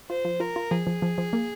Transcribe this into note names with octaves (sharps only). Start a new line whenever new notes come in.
F4 C5
F3
F4 A#4
F4
F3 G#4
F3
F3
F3
A#3